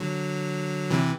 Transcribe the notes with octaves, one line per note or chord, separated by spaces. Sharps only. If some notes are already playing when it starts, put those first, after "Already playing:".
Already playing: D3 F#3
C3 E3